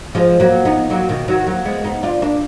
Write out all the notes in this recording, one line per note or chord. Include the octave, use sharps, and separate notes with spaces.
F3 G#3
F#3 A#3
B3 D#4
F#3 A#3
B2 D#3
D#3 F#3
F#3 A#3
G#3 B3
B3 D#4
D4 F4
A#3 D4